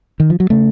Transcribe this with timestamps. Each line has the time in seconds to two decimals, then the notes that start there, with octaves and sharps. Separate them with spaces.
0.20 D#3
0.30 F3
0.40 F#3
0.50 C#3 A3